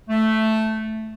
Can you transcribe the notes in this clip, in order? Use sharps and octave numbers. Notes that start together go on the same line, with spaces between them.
A3